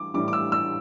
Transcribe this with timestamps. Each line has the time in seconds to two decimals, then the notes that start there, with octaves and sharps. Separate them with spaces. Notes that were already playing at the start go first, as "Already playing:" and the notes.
Already playing: E3 G3 D6
0.14 A2 E3 G3 D6
0.28 D6
0.33 E6
0.52 E6